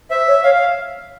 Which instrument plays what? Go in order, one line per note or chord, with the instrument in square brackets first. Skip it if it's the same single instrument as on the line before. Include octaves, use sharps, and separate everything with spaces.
[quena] C5 [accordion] E5
[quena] C#5
[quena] C#5 [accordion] F5
[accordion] F5